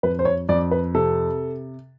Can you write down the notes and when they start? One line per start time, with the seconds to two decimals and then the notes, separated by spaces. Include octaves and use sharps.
0.03 F2 B4
0.19 C5
0.25 C#5
0.49 F2 D5
0.71 B4
0.95 C3 A4